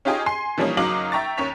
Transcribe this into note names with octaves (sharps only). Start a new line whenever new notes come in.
C#4 D#4 F4 G4 G#4 D#5
G#5 C6 C7
E3 F3 G3 A#3 C#4 D#4
F#1 F#3 D#4 F5 D6 F#7
E5 G5 A#5 C#6 A6
D#2 C#4 C#5 C#6 B6 F7